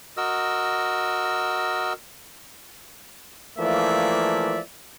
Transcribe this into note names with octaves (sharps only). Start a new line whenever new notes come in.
F#4 A#4 D#5 E6
E3 F3 A3 A#3 D5 E5